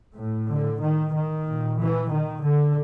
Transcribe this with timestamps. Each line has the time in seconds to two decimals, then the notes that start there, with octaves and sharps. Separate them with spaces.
0.16 A2
0.48 D3
0.82 D#3
1.13 D#3
1.46 A#2
1.78 E3
2.11 D#3
2.44 D3